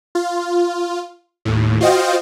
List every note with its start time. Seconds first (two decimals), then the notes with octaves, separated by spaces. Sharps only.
0.15 F4
1.45 D#2 A2
1.81 F4 F#4 C5 D#5 F5 G5